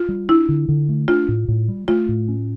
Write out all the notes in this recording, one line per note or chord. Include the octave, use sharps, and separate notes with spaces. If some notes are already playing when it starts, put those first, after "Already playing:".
Already playing: F4
G3
D4 E4
D3
D3
A3
D4 F4
A2
A2
G3
A3 F4
A2
C#4